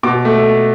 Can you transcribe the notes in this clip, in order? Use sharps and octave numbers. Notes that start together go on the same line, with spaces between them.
B2 D6
A3